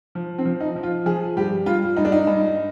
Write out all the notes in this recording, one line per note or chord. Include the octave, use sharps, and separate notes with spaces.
F3
C4
F3
D#4
F3
F4
F3 G#4
G2 G4
G2 F4
G2 D#4
D4
D#4
G2